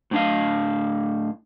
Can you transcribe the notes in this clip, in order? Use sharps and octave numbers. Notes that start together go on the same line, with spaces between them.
A2 D4 F5